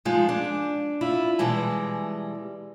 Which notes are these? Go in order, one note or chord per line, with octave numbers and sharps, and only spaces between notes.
F3 G#3 D#4 F4
D4
E4 F4
B2 E3 G3 G#3 A5